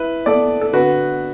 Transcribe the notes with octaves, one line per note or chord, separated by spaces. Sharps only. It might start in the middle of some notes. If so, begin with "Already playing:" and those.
Already playing: E4 B4 E5
B3 A4 D5
A4
D3 F#4 B4